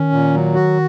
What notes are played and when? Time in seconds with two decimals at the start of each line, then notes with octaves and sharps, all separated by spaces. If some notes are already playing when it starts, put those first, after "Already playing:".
Already playing: D#3 C#4
0.12 A#2
0.34 F#3
0.55 F#4